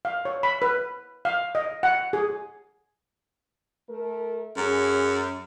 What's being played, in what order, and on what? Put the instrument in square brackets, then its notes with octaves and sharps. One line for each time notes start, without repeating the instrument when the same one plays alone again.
[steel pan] F5
C#5
B5
B4
F5
D#5
F#5
G#4
[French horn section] A3 A#4
[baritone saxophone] F#2 [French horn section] A3 C#4 G#4